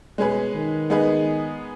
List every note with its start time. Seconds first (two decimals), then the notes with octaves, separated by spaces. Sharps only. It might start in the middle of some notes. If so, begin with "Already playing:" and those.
0.18 B2 G#3 C#4 G#4 B4
0.54 D#3
0.90 G#3 B3 D#4 G#4 B4